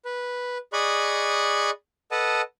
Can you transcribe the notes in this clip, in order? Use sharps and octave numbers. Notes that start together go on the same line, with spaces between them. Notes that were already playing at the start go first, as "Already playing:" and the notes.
B4
G#4 D5 D#5 B5 C#6 F#6
A4 B4 D#5 F#5 A5 D#6